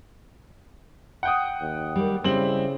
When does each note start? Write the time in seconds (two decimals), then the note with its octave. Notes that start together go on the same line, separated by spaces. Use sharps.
1.23 F#5 G5 D#6
1.61 D#2
1.96 G3 A#3
2.24 C#3 G3 C4 E4 F#7